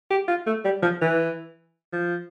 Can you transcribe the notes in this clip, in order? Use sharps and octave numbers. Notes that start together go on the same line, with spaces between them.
G4
F4
A3
G3
F3
E3
F3